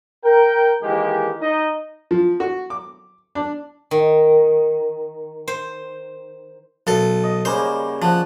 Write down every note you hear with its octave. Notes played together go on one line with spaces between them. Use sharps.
A#4 G5
D#3 E3 G#3 A#3 G4
D#4 D#5
F3
F#4
D6
D4
D#3
C5
B1 A4
D#5
C#3 G3 A#3 C5
F3 F#5 A5